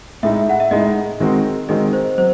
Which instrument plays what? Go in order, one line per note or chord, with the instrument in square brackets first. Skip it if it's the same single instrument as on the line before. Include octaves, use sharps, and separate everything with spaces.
[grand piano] A2 G#3 D#4 [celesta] E5
[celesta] F#5
E5
[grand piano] A2 G#3 D#4 [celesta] D#5
[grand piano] D#3 G#3 C4 D#4 F#4
[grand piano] D#3 G#3 C4 D#4 F#4 [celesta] D#5
[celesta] C5
[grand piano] F#3 [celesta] C5